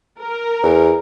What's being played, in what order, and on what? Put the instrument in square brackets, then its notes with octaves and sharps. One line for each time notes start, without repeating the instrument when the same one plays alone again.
[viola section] A#4
[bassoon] E2